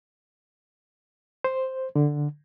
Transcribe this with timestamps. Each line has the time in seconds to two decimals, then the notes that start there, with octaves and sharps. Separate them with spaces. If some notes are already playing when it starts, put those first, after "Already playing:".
1.44 C5
1.96 D3